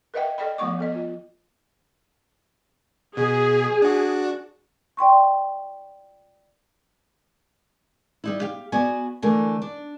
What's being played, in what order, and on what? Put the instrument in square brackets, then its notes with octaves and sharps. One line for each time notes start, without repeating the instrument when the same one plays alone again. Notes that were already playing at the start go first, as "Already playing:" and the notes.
[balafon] A#4 B4 D#5 E5 F#5 G5
A4 D5 D#5 G5 B5
F3 A3 B3 F#5 C#6 D6
B3 A4 D#5
F4
[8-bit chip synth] B2 [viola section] G#4
[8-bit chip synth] D4 F#4
[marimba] D5 G5 C6 C#6
[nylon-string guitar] G3 D#4 E4
G4 F5
B3 F#4 D5 G#5
D3 E3 A3 A#4 G#5
D4